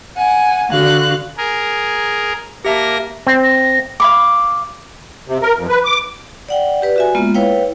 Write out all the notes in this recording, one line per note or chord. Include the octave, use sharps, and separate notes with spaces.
F#5 G#5
D3 F#4 F5 F#6
G#4 A#4
A#3 G4 A#4 E5 A5 A#6
C4
A#6
F5 B5 D6
C3
A#4
F2
B4
D6
D5 F#5 G5
G4 B4 D5
F#4 E5 G#5
G#3 A#3 B3 F4
E4 B4 C#5 F5 G5